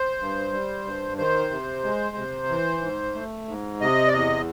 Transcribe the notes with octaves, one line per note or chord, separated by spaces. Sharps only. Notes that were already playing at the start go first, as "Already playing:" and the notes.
Already playing: C5
G2
G3
G2
D#3 C5
C3
G#3
C3
E3
G#2
A3
G#2
C3 D#5
D5
E2 D#5